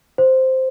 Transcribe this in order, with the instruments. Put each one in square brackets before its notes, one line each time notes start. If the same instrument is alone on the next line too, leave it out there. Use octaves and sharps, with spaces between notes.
[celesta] C5